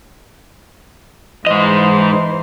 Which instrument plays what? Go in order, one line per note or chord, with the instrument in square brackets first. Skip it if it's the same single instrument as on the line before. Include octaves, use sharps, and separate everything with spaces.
[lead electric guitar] G#2 D#5 [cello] E3 C5